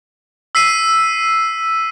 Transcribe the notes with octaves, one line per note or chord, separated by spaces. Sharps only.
E6 B6 C7 D#7